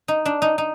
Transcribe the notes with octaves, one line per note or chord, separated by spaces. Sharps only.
D#4
D4
D#4
D#4